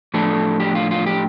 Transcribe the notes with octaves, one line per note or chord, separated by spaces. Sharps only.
A2 F3 A3 D4 A4
G4
F4
F4
G4